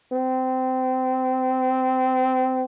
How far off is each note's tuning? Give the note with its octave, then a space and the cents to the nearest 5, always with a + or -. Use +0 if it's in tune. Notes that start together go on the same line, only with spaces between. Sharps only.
C4 -20